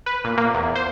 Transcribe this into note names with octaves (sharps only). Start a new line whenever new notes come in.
B4
A#2
A#3
E2
C5